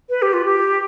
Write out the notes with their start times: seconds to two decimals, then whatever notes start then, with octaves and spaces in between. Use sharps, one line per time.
0.09 B4
0.22 G4
0.33 F4
0.45 G4